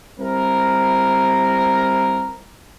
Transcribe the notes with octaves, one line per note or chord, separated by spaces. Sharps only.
G3 C4 E4 A#4